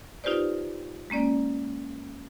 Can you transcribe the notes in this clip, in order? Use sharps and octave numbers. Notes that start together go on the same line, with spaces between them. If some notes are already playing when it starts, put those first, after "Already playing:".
D#4 F4 G4 B4 C5 D5
G#3 A#3 C#4 D5